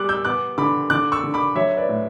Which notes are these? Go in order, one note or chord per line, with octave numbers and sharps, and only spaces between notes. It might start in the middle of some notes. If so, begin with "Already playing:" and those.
Already playing: G3 D6 F#6
E6 G6
B3 D6 F#6
D3 B5 D6
D3 D6 F#6
C#6 E6
D3
B5 D6
F#3 C#5 E5
B4 D5
A2